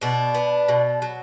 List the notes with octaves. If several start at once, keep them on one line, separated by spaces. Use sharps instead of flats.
B2 D4
B3
B2
F#3